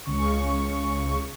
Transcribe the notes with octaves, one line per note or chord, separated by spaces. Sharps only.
C#2 C#3 C#6